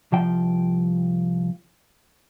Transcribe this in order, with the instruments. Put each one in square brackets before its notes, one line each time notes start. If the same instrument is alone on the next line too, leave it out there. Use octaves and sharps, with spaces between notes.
[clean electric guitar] C2 F3 G5